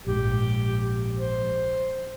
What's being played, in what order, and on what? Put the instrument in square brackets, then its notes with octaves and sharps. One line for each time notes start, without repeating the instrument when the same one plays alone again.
[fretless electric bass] A#1 G#2 [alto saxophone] G4
[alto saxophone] C5